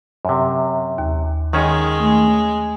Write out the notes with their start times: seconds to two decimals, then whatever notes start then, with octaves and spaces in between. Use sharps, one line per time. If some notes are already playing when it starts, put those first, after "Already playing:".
0.25 F#2 C3
0.98 D#2
1.53 D#3 G#3 C#4 F#5
2.00 A3